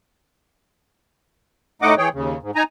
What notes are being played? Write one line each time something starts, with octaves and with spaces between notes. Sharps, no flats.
A2 A3 D#4 D#5 F#5 D6
E3 G#4 C#5 G5
D#2 C#3
G#2
D#4 G#5 A#5